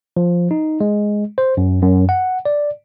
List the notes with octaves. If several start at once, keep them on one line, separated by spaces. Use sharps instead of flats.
F3
D#4
G#3
C5
F#2
F#2
F#5
D5